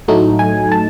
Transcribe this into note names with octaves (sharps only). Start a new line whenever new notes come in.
A2 F#3 A3 D#4
G#5
A5